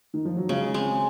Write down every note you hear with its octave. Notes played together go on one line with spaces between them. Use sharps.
D#3
F3
F#3
C#3 G#3
G#3 C4